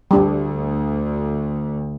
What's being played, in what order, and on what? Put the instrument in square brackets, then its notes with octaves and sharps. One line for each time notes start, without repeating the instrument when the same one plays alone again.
[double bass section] D2 [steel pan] G3 D4